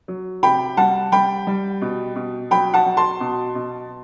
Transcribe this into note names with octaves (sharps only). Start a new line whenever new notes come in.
F#3
C3 G5 B5
G3 F#5 A5
G3 G5 B5
G3
B2
B2
F#3 G5 B5
F#5 A5
F#3
A5 C6
B2
B2